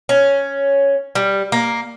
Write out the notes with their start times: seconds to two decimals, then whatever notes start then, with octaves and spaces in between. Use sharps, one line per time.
0.09 C#4
1.15 G3
1.52 A#3